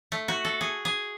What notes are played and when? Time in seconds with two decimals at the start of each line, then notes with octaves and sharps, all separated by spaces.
0.12 A3
0.28 F#4
0.45 A4
0.61 G#4
0.85 G#4